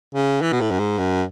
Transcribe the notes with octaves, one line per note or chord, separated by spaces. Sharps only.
C#3
E3
B2
A2
F#2
G#2
F#2